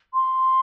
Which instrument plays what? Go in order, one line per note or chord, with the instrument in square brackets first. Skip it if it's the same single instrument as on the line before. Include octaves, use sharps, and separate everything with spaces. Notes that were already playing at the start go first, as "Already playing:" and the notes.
[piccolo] C6